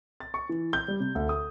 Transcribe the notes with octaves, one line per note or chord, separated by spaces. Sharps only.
A6
C#6
E3
G6
G3
C3
D2
D#6